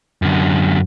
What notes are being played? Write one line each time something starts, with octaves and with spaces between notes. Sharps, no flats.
F#2 D3